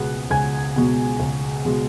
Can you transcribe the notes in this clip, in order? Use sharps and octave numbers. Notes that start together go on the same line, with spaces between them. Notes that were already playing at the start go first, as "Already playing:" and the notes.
Already playing: C#2 B2 G#3 B3 F#5 F#6
C#2 G#5 G#6
B2 G#3 B3
C#2
B2 G#3 B3